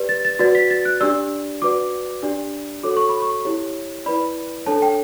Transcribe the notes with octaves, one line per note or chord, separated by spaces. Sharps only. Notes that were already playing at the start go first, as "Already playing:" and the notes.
Already playing: G4 B4 D5
A6
A6
F#4 B4 D5 A6
B6
A6
F#6
D4 G4 D5 E6
F#4 B4 D5 D6
D4 G4 D5
F#4 A4 C#5 D6
C#6
B5
C#6
E4 G4 C#5
E4 B4 D5 B5
D4 A4 C#5 A5
G5